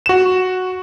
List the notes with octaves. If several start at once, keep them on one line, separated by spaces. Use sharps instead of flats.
F#4 E7